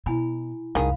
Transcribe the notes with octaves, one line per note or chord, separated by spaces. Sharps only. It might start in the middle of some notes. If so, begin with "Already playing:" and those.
B2 E4 G#5 B5
C2 F#2 D#3 G#4 F5 B5